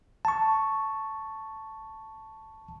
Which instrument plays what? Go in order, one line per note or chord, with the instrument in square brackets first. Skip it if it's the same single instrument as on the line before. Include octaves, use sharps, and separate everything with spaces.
[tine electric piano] A5 C#6